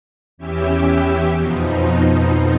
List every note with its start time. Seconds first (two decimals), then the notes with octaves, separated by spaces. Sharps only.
0.38 E2 E3 C#4 G4 E5
1.36 F2 B2 F3 D#4